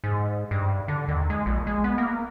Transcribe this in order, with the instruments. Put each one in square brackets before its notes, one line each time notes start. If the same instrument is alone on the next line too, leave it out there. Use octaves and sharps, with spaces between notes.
[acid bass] G#2
G2
D3
D#2
G#3
A#1
G#3
B3
A#3